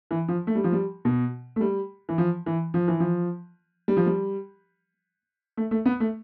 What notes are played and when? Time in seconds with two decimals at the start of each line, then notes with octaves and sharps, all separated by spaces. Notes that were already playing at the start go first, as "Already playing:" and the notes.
0.11 E3
0.28 F3
0.47 A3
0.55 G3
0.64 F3
0.72 G3
1.05 B2
1.56 A3
1.61 G3
2.09 E3
2.18 F3
2.46 E3
2.74 F3
2.88 E3
3.00 F3
3.88 G3
3.97 F3
4.06 G3
5.57 A3
5.71 A3
5.86 B3
6.00 A3